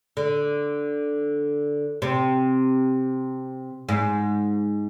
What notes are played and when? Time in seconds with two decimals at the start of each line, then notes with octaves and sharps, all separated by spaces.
0.17 D3
2.02 C3
3.89 G#2